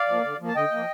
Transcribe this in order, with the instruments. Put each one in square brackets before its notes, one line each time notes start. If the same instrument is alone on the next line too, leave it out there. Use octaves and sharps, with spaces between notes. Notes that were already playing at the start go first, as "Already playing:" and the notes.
Already playing: [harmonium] D5 F5
F3 A#3
D3
F3 A#3
A5
D3 D#5 G5
F3 A#3